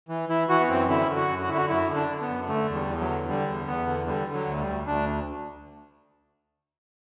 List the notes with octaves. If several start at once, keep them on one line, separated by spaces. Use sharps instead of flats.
E3
E3 E4
E3 F#4
B3
F#2 C4
D3 E4
D3
F#4
F#2
F#4
D3 E4
F#4
F#2 E4
D3
D4
D3
B3
F#2
D3 A3
E2
G3
E2
F#3
D3
D3 G3
E2
E2 B3
D3
D3 G3
D3
F#3
D2
G3
D2
D2 D4